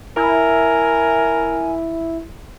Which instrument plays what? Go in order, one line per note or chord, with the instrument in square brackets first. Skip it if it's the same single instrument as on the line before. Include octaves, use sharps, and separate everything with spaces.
[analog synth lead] E4 [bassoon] A#4 [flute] G#5